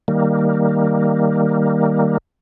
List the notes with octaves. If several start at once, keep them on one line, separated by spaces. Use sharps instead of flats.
D#3 G3 A#3